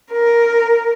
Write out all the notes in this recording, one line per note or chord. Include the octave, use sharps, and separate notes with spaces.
A#4